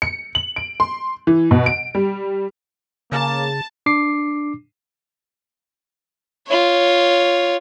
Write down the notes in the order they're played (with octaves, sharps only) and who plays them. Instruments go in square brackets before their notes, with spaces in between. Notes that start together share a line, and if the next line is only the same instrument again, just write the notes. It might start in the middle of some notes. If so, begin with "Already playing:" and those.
[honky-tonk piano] C#7
F#7
D7
C6
E3
B2
D7
G3
[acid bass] C#3 [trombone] A#3 [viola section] A5
[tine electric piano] D4 D6 C7
[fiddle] F4 C#5